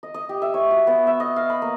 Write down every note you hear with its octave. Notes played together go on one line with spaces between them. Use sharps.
D#5
D#5
G4
E5
C#5
F#4
B3
E5
D#5
F5
B5
A#3